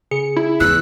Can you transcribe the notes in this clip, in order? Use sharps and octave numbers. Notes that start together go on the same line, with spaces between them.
C#3 G#4 C#7
E4
E2 D#4 E6 F#6